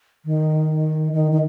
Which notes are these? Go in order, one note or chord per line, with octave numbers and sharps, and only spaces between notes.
D#3
D#3
D#3